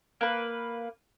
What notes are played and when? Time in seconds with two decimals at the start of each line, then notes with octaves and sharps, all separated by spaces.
0.21 A#3 B4